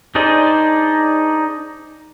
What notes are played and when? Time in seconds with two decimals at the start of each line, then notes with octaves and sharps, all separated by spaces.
0.15 D4 D#4 G#4 C5 D5